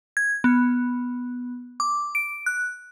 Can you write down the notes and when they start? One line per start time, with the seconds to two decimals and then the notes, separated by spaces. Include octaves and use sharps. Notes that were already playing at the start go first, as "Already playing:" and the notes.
0.17 G#6
0.44 B3
1.80 D6
2.15 D7
2.46 F#6